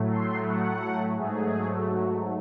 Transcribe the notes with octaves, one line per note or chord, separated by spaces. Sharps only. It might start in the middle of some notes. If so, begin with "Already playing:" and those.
Already playing: A2 F#3 A3
C6
F#5
G#2 F#3 A3 G#4
F#4